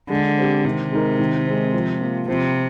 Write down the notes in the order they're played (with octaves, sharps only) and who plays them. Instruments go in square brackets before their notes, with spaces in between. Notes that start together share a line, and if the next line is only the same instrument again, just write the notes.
[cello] D3 [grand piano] G#3
[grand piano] C4 G4
[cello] C3 [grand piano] D#3
[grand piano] G#3 D#4 A#4
D#3
G#3 C4
F3
A#3 F4
[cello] C3 [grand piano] F3